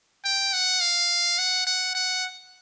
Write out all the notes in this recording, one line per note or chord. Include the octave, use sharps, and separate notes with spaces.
G5
F#5
F5
F#5
F#5
F#5